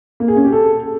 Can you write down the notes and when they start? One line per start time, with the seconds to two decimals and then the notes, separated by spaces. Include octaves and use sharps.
0.20 A#3
0.28 G#4
0.36 C#4
0.44 G4
0.52 A4